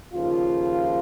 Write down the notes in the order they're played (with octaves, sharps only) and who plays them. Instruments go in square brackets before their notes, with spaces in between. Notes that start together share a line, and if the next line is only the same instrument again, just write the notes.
[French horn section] D#2 C#3 F3 F4